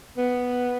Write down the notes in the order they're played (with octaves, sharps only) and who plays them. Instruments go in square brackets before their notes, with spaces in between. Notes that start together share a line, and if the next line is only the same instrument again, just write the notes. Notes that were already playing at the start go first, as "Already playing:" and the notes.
[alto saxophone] B3